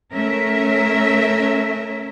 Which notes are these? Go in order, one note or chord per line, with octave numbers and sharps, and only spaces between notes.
A3 C#4 A#4 E5